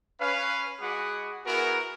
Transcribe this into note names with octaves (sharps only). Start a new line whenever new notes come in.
C#4 B4 F5
G#3 F#4 G#4 F#5 B5 D6
B3 E4 F#4 G#4 A#4